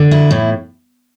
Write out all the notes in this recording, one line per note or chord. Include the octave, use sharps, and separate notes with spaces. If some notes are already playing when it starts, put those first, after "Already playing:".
Already playing: D3
E4
A2